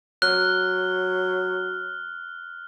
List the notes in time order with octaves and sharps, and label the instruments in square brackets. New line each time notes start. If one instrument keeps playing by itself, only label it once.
[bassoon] F#3 [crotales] F6 [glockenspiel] F#6